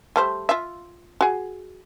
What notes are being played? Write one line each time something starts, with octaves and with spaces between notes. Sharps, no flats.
G3 A3 C5
F4 E5
F#4 G#4